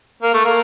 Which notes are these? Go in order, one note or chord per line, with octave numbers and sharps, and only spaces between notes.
A#3
A3
A#3